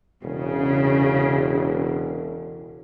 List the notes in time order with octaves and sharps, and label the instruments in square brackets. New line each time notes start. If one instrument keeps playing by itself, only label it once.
[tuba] E1 [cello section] C#3